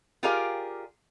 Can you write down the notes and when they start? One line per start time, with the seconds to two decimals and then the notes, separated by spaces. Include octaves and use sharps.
0.23 F4 G4 G#4 A#4 D5 F5